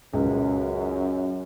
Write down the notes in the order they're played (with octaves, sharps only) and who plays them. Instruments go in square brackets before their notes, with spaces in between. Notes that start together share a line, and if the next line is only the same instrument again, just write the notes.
[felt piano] C#2 [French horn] F#2